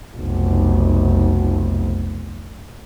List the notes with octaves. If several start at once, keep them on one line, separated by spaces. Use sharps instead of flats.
F1 B1